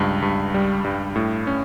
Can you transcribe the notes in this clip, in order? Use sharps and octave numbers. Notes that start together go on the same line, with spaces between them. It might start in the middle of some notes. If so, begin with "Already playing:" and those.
Already playing: C#2 G2
G2
G3
G2
A2
C#4